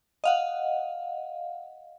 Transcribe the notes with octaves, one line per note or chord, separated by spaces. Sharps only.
D#5 F5 F#5